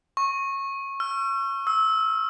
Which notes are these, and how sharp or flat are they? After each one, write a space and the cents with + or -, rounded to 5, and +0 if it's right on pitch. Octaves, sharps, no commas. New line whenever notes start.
C#6 -20
E6 +45
E6 -25